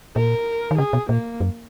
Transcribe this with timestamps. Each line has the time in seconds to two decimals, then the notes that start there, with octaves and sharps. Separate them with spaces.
0.16 A#2 A#4
0.71 D#3
0.78 C#3 G#4
0.93 B2
1.09 A#2 A#3
1.40 F#2